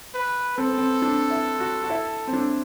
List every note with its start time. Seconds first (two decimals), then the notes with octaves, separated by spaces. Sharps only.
0.14 B4
0.58 C4 A4
0.67 B3
0.78 C4
1.02 D4
1.30 E4
1.60 F#4
1.83 F#4
1.90 E4
2.27 C4
2.33 D4